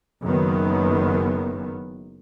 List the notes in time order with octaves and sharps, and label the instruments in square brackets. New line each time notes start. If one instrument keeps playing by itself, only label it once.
[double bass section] F#1 F#2 D#3 B3